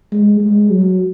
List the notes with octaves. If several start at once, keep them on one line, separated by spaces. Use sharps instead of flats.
G#3
G#3
F#3